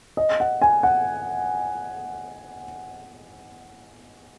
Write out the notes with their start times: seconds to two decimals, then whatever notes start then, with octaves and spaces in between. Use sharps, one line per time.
0.17 D#5
0.40 F#5
0.62 G#5
0.83 F#5